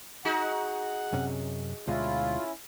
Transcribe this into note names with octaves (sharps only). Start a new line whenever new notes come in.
D#4 F#4 G#4 F#5
F#2 C3 C#4
D2 B2 G#3 C#4 E4 F4